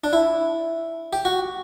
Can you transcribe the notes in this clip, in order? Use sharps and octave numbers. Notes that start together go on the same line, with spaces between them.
D4
E4
G4
F#4